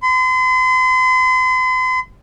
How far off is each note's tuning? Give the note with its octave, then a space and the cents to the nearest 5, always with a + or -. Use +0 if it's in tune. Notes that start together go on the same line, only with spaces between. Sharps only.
C6 -40